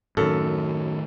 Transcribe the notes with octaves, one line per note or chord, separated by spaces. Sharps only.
F#2 A2 D#3 A4